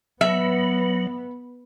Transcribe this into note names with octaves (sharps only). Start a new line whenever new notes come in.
F#3 B3 E5